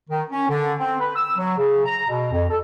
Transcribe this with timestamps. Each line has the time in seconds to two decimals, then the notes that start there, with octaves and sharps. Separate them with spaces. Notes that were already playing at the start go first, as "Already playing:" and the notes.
0.10 D#3
0.31 C#4
0.49 D3
0.79 C4
1.00 B4
1.16 E6
1.38 F#3
1.58 C#3
1.85 A#5
2.09 B2
2.32 F2
2.50 A4